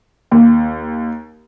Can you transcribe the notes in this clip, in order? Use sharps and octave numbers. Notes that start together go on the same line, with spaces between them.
D#2